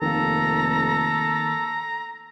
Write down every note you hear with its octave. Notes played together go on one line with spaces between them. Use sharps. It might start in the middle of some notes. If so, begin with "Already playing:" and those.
F1 D#3 A#3 A4 A#5